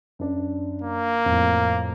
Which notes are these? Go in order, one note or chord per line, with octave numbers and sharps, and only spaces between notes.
F#2 D4
A#3
F2 A2